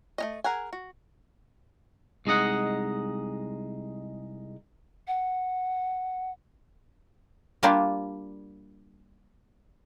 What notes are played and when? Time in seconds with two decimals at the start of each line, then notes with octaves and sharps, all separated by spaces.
0.18 A3 C#4 D#5
0.44 G#4 A#4 F#5 G#5
0.73 F#4
2.26 C2 G#3 D#4 D#5 F#5
5.07 F#5
7.63 G3 A#3 D4 F4 G4